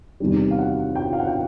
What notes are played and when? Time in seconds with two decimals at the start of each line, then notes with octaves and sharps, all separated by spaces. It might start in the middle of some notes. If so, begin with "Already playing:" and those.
0.20 E2 C3 D#3 G3
0.51 F5
0.59 F#5
0.95 G5
1.13 F5
1.20 F#5
1.27 G5